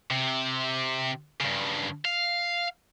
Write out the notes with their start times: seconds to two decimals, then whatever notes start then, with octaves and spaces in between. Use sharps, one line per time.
0.11 C3
1.41 G2 C#3
2.05 F5